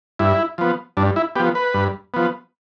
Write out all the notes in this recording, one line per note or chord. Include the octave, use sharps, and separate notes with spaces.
G2 E4
F3 B3
G2 D4
E4
F3 B3 G4
B4
G2
F3 B3